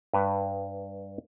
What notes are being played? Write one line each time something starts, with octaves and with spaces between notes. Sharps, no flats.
G2 B4